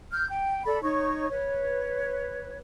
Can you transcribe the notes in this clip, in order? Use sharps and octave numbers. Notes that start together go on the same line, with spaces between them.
F6 G6
G5
A4 D5 B5
D#4 C#5 C#6
B4 C#5